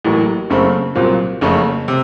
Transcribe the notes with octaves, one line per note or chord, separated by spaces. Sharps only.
A1 A2 F#3 A#3
F#1 F#2 C#3 A3 C4
C2 A#2 F#3 C4 F4
F#1 F2 C#3 A3 C#4
C3